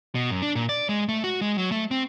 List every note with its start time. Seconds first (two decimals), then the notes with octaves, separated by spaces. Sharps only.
0.15 B2
0.30 F#2
0.42 D4
0.55 A#2
0.69 D5
0.89 G#3
1.09 A3
1.24 F#4
1.41 G#3
1.58 F#3
1.72 A3
1.91 C4